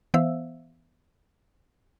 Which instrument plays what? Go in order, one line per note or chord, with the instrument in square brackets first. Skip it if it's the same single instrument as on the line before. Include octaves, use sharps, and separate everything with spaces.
[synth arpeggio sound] E3 B3 C5 E5 F5 E6